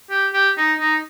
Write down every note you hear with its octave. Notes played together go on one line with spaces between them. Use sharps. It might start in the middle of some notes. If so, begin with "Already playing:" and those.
G4
G4
D#4
D#4